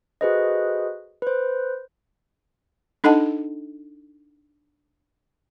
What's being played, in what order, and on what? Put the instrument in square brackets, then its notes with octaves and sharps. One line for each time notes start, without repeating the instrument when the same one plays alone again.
[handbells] F#4 G#4 A4 B4 C5 D#5
B4 C5
[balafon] D4 D#4 A4 D#5 F#5 A5